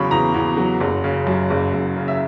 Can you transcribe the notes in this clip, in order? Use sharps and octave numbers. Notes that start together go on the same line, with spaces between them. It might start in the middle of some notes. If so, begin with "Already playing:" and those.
Already playing: E2 C#3 F#3 B5 C#6
E2 A#5
E2
F#3
F#1
C#3
F#2
F#1
F#1
C#3
E5